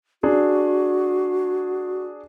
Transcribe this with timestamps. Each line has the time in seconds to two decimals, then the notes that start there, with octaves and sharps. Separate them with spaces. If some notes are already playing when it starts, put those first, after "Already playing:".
0.23 D4 F#4 G#4